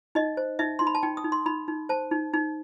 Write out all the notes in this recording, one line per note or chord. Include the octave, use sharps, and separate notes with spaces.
D#4 D#5
C5
D#4 E5
D#4 C6
B5
A5
D#4 G5
D#6
D#4
C6
D#4 B5
D#4
C5 A5
D#4
D#4